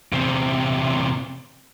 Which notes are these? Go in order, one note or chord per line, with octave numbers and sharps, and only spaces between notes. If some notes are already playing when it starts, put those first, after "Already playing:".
E2 C3